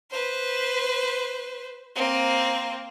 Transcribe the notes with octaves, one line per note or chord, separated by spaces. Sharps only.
B4 C5
A#3 C4